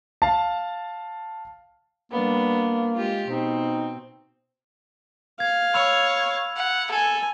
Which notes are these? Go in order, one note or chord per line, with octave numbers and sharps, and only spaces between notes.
F5 A5
G3 A#3 B3 D4
G#3 F4 G4
B2 C4 D#4
F5 G#6
C#5 B5 E6 F7
F#5
A4 G#5